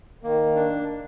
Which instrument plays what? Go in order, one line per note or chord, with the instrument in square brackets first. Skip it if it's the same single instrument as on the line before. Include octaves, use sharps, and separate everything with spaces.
[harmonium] D#3 [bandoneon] A#3
[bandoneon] D4